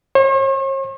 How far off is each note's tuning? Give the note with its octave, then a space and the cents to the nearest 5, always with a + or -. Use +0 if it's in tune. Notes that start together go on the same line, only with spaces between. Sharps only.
C#5 -45